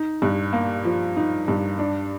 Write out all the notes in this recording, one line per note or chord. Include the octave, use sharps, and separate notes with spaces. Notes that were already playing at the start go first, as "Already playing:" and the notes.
Already playing: D#4
G2
A#3
F3
D#4
G2
D4